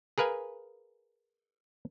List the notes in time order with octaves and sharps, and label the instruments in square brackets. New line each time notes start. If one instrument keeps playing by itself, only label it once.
[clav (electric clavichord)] G#4 A#4 B4 F5 G#5